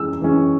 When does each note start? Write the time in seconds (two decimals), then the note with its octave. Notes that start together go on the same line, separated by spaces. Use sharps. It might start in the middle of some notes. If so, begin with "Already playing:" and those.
Already playing: E3 G#3 C#4 E6
0.21 E3 G#3 C#4